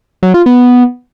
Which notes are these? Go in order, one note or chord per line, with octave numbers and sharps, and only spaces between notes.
F#3
F4
B3